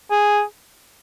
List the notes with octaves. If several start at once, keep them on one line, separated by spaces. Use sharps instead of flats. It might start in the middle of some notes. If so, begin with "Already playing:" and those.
G#4